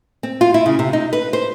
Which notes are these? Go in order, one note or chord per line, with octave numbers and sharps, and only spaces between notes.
C4
F4
E4
C#3
C3
D#4
B4
C5